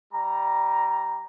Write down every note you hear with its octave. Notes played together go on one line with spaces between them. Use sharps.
G3 A#5